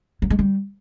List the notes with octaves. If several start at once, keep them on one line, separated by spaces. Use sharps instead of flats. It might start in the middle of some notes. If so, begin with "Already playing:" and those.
F#3
G#3
G3